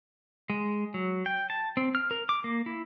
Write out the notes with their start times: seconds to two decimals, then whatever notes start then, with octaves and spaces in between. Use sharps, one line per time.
0.50 G#3
0.94 F#3
1.26 G5
1.50 A5
1.77 C4
1.95 F6
2.11 A#4
2.29 D6
2.44 A#3
2.66 E4